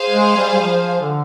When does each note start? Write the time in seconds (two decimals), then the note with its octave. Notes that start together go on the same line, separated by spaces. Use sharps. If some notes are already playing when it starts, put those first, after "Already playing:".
Already playing: G#4 C5 F5
0.10 G#3
0.37 G3
0.54 G3
0.62 F3
1.00 D3